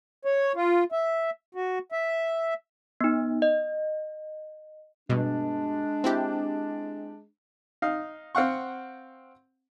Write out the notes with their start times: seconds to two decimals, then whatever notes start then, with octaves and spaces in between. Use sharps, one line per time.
0.25 C#5
0.55 F4
0.92 E5
1.55 F#4
1.92 E5
3.01 B3 D#4
3.42 D#5
5.09 G2 B2 G#3 D4
6.04 C4 E4 G4
7.82 D#4 F5
8.35 C4 F5 F#5 C#6